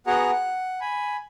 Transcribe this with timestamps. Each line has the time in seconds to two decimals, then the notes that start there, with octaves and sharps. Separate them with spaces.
0.07 B3 F#4 G#4 F#5 A#5
0.32 F#5
0.81 G#5 B5